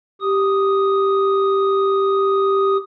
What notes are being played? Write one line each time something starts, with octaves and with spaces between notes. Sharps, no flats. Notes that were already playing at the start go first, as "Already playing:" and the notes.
G4 D#6